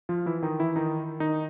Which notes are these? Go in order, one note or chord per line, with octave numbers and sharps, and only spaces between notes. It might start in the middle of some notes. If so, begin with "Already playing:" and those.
F3 F4
E3 E4
D#3 D#4
E3 E4
D#3 D#4
D#3 D#4